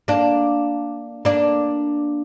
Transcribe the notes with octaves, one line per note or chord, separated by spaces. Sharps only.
A#3 D4
A#3 D4